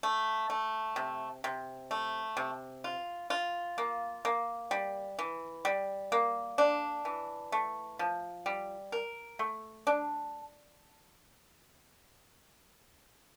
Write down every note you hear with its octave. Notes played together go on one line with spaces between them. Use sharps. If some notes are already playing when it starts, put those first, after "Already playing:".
A3
A3
C3
C3
A3
C3
F4
F4
A#3
A#3
G3
E3
G3
A#3
D4
E3
A3
F3
G3
A#4
A3
D4